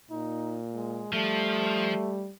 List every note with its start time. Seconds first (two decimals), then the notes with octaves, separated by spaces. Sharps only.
0.10 A#2 D#4
0.73 G#3
1.13 F3 G3 A3